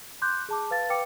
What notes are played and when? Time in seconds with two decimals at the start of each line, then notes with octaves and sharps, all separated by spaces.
0.22 C6 D6 F#6 G6
0.49 G#4 A5 D6
0.71 B4 F5 A5 A6
0.90 B4 F5 G5 D6 C#7